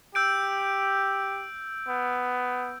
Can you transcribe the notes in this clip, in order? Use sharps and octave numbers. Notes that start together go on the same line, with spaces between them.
G4 E6 G6 D7
B3